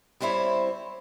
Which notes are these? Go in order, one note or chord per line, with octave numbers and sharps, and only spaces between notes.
G3 C4 E4 C5 C#5